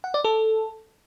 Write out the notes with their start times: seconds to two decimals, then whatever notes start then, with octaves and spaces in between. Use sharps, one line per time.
0.04 F#5
0.14 D5
0.24 A4